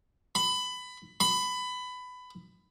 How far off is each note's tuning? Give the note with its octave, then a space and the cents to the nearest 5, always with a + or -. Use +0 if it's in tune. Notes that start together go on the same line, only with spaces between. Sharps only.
B5 +20
B5 +20